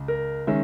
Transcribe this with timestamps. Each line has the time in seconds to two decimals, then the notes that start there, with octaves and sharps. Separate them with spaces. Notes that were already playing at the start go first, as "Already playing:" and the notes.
Already playing: C#2
0.08 A#4
0.47 D#3 G#3 C#4 E5